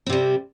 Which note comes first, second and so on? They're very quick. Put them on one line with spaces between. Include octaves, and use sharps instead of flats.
C4 C3 G3